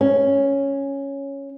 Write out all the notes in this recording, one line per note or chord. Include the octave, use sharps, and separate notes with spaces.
C#4